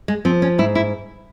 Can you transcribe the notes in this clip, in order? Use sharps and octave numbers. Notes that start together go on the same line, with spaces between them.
G#3
F3 C4
C#4
G#2 E4
E4